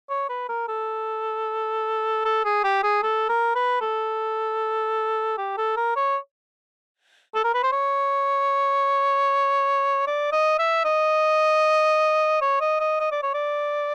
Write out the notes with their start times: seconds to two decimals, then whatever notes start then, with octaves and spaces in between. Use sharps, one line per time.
0.10 C#5
0.29 B4
0.49 A#4
0.68 A4
2.25 A4
2.45 G#4
2.64 G4
2.83 G#4
3.03 A4
3.29 A#4
3.55 B4
3.81 A4
5.38 G4
5.57 A4
5.77 A#4
5.96 C#5
7.35 A4
7.44 A#4
7.54 B4
7.63 C5
7.72 C#5
10.07 D5
10.33 D#5
10.59 E5
10.85 D#5
12.42 C#5
12.61 D#5
12.80 D#5
13.00 D#5
13.12 D5
13.23 C#5
13.34 D5